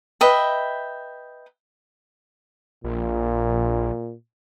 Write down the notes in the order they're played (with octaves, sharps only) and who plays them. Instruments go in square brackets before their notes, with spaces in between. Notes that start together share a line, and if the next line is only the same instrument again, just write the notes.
[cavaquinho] B4 D#5 E5 G5
[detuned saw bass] A#1 [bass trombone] A#2